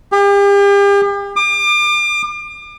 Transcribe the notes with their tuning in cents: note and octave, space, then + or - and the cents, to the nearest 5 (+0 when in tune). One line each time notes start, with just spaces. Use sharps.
G4 +40
D6 +35